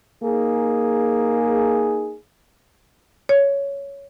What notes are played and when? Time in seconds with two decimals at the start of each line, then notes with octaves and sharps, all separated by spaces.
0.24 A#3 D#4 G#4
3.29 C#5